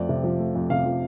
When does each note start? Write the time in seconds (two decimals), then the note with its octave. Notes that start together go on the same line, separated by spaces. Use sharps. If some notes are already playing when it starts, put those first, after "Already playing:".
Already playing: F2 A3 D5
0.09 C3
0.24 F3
0.39 A3
0.55 F2
0.70 C3 F5
0.85 F3